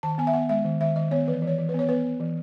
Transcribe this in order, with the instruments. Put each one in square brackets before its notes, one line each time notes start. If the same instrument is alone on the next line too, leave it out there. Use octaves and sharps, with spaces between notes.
[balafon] D#3 A5
B3 G#5
E5
B3 F#5
G#3 E5
D#3
D#3 E5
D#3 D#5
B3 C#5
E3 B4
E3
C#5
E3
B4
B3 C#5
B3 B4
B3
E3